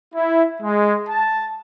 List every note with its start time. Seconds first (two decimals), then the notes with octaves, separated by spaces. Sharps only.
0.14 E4
0.61 G#3
1.08 A5